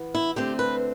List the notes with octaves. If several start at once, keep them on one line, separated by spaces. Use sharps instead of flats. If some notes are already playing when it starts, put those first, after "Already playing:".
Already playing: E3 B3
E4
D3 A3 C4 G4
B4